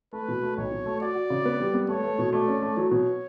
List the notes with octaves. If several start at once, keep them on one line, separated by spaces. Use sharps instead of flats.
A3 B4
B2
A3
B1 C#5
B2
A3
F#4 D5
F#4
C#3
B3
G3
B3
A3 C#5
A3
B2
A3 D5
C#4
A3
F#3 C#5
B2